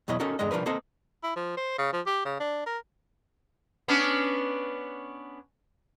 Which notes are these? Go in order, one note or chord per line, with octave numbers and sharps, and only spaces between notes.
E2 B2 F#3 E4 D#5
C#4 D#4 F#4 A4 A#4
E2 G2 D3 G#3 D#5
C2 F3 D4 A#4 B4
A#3 C4 A4 C5 D#5
E4
F3
C5
C#3
F3
G4
C#3
D4
A#4
B3 C#4 D4